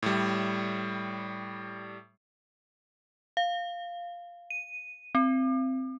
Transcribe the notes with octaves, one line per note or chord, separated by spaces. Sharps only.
A2 G3
F5
D#7
C4